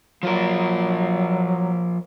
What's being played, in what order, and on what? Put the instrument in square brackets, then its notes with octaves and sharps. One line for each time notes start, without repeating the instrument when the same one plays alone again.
[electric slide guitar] F3 F4 A#4 [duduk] F#3